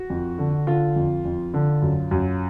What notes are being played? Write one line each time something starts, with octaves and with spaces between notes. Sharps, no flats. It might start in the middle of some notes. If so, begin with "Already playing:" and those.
Already playing: F#4
F2
D3
D3 F4
F2
F2
D3
F#2
F#2